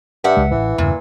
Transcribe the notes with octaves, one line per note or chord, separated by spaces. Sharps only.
G2 E5 F#5
C#2 G#3
A1 E3
E2 G2 A#2 C#3